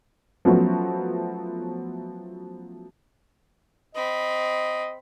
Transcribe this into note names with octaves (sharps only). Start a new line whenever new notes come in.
F3 F#3 A3 B3 C#4 F#4
C4 D#5 B5